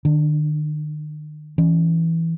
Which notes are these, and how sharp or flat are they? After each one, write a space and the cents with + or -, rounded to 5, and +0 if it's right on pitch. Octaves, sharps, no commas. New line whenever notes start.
D#3 -45 D4 +5
E3 +0 C#4 +0